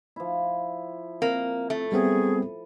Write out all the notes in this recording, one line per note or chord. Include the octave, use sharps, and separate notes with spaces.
F3 E4
A#3 C4
A3
G3 B3 C4 G#4